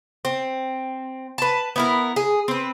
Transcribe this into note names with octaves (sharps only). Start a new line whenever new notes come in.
C4
B4 A5
B3 E4 A#4
G#4
C4 B4